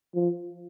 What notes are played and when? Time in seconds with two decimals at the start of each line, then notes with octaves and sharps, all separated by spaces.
0.14 F3